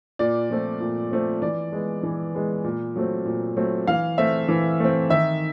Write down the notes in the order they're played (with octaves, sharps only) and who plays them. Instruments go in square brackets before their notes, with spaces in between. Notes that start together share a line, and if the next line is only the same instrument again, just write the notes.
[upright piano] A#2 D5
F3 A3 C4
A#2
F3 A3 C4
E3 D5
G#3 B3
E3
G#3 B3
A#2
F#3 A3 C4
A#2
F#3 A3 C4
E3 F5
A3 C4 E5
E3
A3 C4
D#3 E5